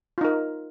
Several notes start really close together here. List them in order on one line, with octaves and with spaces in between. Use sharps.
F4 D#4 A#4